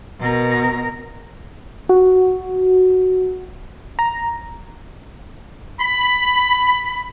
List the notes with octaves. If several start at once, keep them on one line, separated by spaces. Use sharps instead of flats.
B2 A#4
F#4
A#5
B5